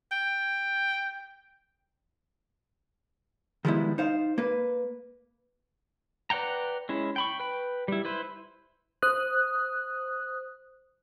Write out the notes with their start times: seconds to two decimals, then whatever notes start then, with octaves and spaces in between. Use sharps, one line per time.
0.12 G5
3.65 D#3 F3 G3 G#3 B3 E4
3.98 D#4 C5 F5
4.38 A#3 B4
6.30 B4 D5 F#5 G5 A#5
6.89 G#3 C#4 E4
7.16 G5 B5 C#6
7.40 B4 G5
7.88 G3 E4
8.05 E4 B4 C5
9.02 C5 D#6 F#6